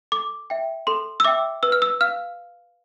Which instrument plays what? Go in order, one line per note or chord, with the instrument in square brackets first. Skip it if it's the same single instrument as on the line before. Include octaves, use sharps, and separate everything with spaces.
[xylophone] A4 D6
E5 G5
A4 C6
E6
E5 G5 D6
B4 E6
F6
E6
F5 F6